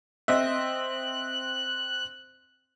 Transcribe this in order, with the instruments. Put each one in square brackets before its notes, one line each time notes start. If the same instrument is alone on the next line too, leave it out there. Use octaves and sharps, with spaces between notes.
[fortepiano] C4 D#5 E5 [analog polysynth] F#6